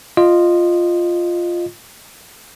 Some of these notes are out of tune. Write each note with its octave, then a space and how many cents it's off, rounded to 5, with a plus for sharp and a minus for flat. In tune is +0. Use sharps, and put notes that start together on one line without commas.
F4 +0 D#5 -15